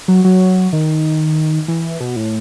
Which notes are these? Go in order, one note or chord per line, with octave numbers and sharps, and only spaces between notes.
F#3
F#3
D#3
E3
B2
A2